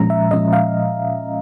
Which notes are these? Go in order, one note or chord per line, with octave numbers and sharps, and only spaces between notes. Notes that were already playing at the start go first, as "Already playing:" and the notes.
Already playing: A#2 F3 G#3 C#4 A#5
E5
A#2 F3 G#3 C#4 D#5
F5